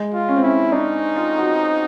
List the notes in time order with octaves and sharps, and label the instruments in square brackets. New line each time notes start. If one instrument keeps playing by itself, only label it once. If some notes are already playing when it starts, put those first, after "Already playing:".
Already playing: [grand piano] G#3
[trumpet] F4
[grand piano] C#4
C4
[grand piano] C#4 [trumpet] E4
[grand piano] D4 [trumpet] D#4
[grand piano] F4
F#4